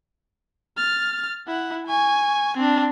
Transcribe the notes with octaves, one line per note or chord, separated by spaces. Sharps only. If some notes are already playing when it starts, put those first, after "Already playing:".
F6 A6
E4 F#5
G#5 C#6
C4 D4